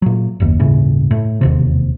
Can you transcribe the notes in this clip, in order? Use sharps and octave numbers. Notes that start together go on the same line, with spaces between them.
A#2 F#3
F#1 D#2
G1 D#2 A2 C#3
A2
E1 D#2 C3